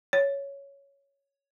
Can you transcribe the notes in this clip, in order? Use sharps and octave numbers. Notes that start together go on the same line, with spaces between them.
C#5